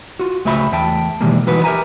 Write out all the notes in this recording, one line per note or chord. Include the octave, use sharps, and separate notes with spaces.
F4 F#4
C#2 A3 F#4 E5 B5
E2 A3 E5 G5 A5
B2 D#3 E3 G3 G#3 A#3
E3 D#4 F#4 B4
G4 A#4 C5 E5 G#5 A#5